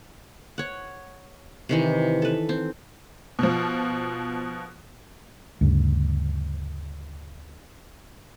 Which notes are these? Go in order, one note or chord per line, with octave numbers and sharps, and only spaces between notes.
C#5 F#5
C3 D#3 E3
A4 B4
C4
B2 F3
D2 G2 C#3